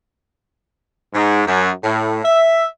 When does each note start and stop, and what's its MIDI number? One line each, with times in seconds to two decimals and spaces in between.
1.14 1.43 44
1.47 1.70 42
1.84 2.20 45
2.25 2.65 76